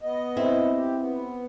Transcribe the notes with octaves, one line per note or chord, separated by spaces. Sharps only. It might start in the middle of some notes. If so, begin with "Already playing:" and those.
B3 D#5
C4 E4
G4
B3